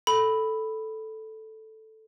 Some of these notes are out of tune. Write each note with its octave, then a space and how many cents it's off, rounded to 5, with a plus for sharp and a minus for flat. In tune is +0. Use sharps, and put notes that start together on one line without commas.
A4 +0 B5 +0